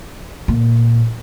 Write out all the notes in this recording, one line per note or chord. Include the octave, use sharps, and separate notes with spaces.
A#2